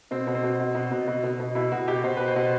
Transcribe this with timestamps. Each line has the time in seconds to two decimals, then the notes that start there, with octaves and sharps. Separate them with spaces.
0.11 B2 C4
0.27 B2
0.35 C4
0.43 B2
0.59 B2
0.75 B2
0.91 B2
1.07 B2
1.23 B2
1.40 B2
1.55 B2 E4
1.72 B2 F#4
1.88 B2 G4
2.04 B2 C5
2.17 B2 B4
2.28 C5
2.36 B2